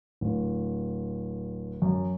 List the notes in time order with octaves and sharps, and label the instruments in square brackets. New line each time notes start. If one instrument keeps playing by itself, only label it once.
[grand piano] D1
F#2